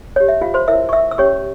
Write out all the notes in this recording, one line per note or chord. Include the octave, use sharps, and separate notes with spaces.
G4 C#5
E5
F4 F5
C5 C6
E4 A#4 C#5 E5 E6
C#6
E5 E6
E6
C#4 G4 C#5 C#6